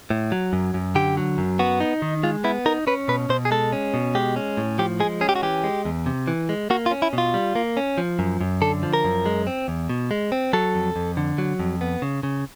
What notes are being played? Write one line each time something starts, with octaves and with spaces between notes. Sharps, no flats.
A2
F#3
F#2
F#2
D3 G4
F#3
F#2
B3 F#4
D#4
D#3
G#3 F4
B3 E4
D#4 A#4
C#4 B4
B2 B4
B2 C5
G#4
G#3 A4
C#4
B2
G#3 G4
C#4
A2
F3 G4
G#3 G#4
C#4 G#4
G4
F#4
E3 G4
G#3
E2
C3
E3
G#3
A#3 F#4
F4
C#4
E4
B2
F4
G3
A#3
C#4
F3
F#2
F#2
D3 A4
F3
A#4
F#2
G#3
C4
E2
B2
G#3
C4
F#3 A4
F2
F2
D3
F#3
F2
B3
C#3
C#3